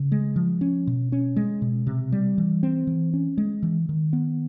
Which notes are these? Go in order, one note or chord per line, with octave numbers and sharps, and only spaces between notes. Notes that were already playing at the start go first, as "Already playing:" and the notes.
Already playing: C#3
G#3
F3
C#4
B2
C#4
G#3
B2
C3
G3
E3
C4
E3
C#4
G#3
E3
D#3
B3